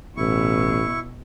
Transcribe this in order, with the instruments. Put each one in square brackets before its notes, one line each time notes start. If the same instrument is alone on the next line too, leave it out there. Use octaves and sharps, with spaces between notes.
[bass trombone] A1 [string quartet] B2 [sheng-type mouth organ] E4 C#6